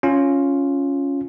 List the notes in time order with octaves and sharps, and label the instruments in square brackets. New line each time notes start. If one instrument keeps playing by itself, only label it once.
[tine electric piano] C#4 F4